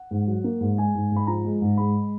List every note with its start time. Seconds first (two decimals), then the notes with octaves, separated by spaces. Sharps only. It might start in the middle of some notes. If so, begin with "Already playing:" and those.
Already playing: F#5
0.11 G#2
0.27 F#3
0.44 A#3
0.61 G#2
0.78 G#3 G#5
0.95 G#2
1.12 G#2 B5
1.27 F3 A#5
1.45 G#3
1.62 G#2
1.78 G#3 B5